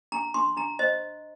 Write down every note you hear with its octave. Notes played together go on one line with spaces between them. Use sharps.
D4 A#5
D4 C6
D4 A#5
C5 D#5